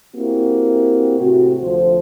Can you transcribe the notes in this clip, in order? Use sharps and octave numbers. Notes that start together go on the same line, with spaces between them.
A#3 C4 E4 F#4 G4
A2 C3 F#4
D2 F3 C5